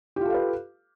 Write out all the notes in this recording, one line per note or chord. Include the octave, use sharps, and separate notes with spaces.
F4 G4 A4 B4 F5